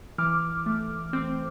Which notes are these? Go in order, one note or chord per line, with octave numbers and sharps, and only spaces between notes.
E3 D6 F6
A3
C4